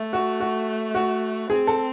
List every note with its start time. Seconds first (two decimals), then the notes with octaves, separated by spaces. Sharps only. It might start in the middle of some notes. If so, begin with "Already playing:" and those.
Already playing: A3
0.13 F#4
0.40 F#4
0.95 F#4
1.50 C4 G#4
1.67 A4